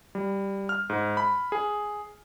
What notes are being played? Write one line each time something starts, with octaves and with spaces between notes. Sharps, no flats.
G3
F6
G#2
B5
G#4